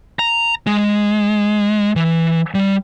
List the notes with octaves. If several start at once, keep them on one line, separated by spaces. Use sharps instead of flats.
A#5
G#3
E3
G3